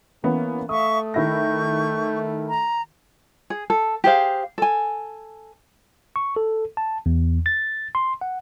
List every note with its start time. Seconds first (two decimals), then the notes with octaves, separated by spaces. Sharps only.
0.24 E3 A#3 B3 C#4
0.69 A3 E5 F5 C#6 D#6
1.14 D#3 E4 C#6 G6 A#6
2.48 A#5
3.50 G#4
3.70 A4
4.04 G4 G#4 C5 F5
4.58 A4 G#5
6.16 C#6
6.36 A4
6.77 A5
7.06 E2
7.46 A6
7.95 C6
8.21 F#5